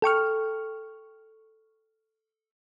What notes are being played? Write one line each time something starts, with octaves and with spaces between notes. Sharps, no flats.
A4 G5 C#6 F6